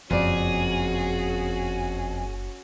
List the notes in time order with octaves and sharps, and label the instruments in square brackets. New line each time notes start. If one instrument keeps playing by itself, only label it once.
[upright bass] F#1 [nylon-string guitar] F2 D5 [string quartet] C#4 F#4 [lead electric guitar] G#4